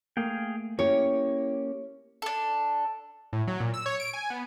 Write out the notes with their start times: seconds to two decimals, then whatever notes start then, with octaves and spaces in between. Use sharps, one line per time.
0.17 A3 A#3 G#4 F5 G5
0.79 A#3 C#4 E4 G4 C#5
2.22 D4 A4
3.33 A2
3.48 F#3
3.60 A#2
3.74 E6
3.86 C#5
4.00 D7
4.14 G#5
4.30 B3